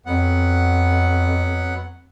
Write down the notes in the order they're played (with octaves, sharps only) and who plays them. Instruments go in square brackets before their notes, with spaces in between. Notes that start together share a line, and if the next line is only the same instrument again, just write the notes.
[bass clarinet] F2 [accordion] F#3 B3 F#5